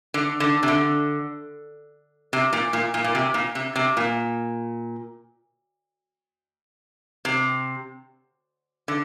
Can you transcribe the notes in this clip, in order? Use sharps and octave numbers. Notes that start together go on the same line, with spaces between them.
D3
D3
C3
D3
C3
A#2
A#2
A#2
A#2
C3
A#2
C3
C3
A#2
C3
D3